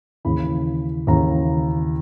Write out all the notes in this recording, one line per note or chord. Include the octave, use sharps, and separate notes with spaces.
D#2 C#3 E3 B5
D#2 C#3 E3 A#5